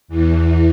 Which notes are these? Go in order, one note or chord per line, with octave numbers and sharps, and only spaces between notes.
E2 E3